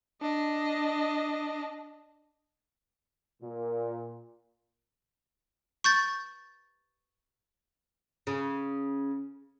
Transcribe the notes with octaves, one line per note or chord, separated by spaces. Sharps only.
D4 D#5
A#2
C#6 G6 A6
C#3